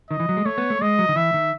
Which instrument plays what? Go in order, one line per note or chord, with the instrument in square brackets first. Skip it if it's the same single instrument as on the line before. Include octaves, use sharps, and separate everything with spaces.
[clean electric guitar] D#3 [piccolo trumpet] D#5
[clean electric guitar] E3
F#3
G#3
[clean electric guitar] A3 [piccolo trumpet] C#5
[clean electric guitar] B3
A3
[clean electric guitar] G#3 [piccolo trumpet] D#5
[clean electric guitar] F#3
D#3
[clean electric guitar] E3 [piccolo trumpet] E5
[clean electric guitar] D#3